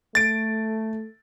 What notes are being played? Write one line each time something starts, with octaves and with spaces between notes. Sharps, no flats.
A3 A6 D7